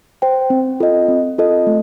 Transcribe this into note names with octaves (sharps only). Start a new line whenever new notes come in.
C5 G5
C4
F4 A4 D#5
C4
F4 A4 D#5
A3